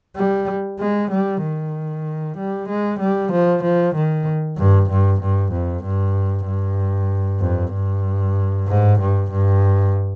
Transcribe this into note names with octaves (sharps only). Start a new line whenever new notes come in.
G3
G#3
G3
D#3
G3
G#3
G3
F3
F3
D#3
G2
G2
G2
F2
G2
G2
F2
G2
G#2
G2
G2